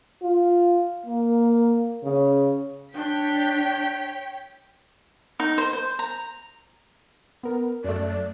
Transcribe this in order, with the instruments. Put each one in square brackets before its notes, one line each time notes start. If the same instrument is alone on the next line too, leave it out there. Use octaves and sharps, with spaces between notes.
[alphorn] F4
A#3
C#3
[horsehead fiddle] D4 [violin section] C#5 G5 B6
[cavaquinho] D#4
C5
C5
A#5
[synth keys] B3 A#4
[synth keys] F#2 A3 [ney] D5